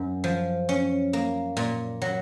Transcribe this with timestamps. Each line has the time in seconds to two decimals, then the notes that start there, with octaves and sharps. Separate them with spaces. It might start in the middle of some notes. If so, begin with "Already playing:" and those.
Already playing: F#2
0.24 F3
0.69 C#4
1.13 A#3
1.57 A#2
2.02 F#3